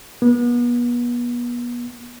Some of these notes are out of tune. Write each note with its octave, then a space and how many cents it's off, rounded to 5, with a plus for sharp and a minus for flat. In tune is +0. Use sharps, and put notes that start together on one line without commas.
B3 -35